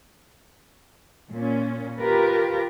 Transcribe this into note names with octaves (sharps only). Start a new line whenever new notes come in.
A#2 C#4
F4 G4 A#4 B4